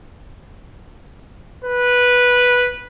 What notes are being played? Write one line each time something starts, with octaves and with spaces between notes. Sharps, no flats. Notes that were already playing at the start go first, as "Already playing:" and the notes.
B4